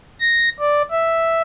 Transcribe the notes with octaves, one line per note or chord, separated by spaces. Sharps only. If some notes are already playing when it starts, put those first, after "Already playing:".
A#6
D5
E5